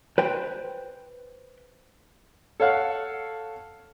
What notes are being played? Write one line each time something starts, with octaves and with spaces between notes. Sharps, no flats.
B4 C5 G5
A4 C#5 F5 F#5